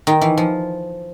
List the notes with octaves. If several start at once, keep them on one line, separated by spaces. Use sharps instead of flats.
D#3
E3
F3